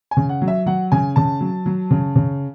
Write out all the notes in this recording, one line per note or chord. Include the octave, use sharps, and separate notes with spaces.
G#5
C#3
F#5
F#3
E5
F#3 F#5
C#3 G#5
C#3 A5
F#3
F#3
C#3
C#3